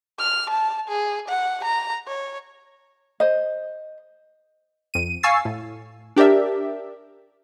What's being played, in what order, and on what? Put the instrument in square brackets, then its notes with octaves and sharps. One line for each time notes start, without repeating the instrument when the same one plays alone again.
[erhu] F6
A5
G#4
F#5
A#5
C#5
[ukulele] C5 D#5
[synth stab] F2 D#7
F5 G#5 C#6 E6 A6 C7
A2
D4 G4 A#4 D5 E5